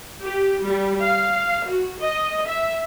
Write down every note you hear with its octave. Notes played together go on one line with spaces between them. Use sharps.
G4
G3
F5
F#4
D#5
E5